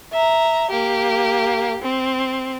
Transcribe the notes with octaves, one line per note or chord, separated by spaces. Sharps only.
E5 A#5
A#3 G4
C4